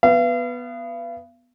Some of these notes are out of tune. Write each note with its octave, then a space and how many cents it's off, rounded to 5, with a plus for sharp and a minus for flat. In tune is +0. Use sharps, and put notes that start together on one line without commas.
B3 +0 F5 -40